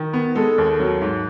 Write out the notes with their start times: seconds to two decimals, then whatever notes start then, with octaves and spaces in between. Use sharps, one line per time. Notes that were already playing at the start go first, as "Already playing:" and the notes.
Already playing: D#3
0.13 B3
0.35 G#3 A4
0.58 D#2
0.80 F#3
1.02 G#2